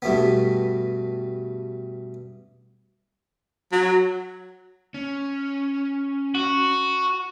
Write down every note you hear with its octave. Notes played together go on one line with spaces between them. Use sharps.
G2 B2 A3 B3
F#3
C#4
F#4